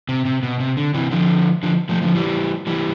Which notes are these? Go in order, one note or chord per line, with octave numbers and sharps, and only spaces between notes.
C3
C3
B2
C3
D3
C3 E3
D3 F3
D3 F3
F3 A3
D3 F3
E3 G3
E3 G3